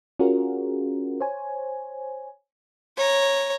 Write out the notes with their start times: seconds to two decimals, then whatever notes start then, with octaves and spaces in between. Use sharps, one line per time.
0.19 C#4 F4 F#4 G#4 A#4
1.21 C5 C#5 G#5
2.97 C#5 A#5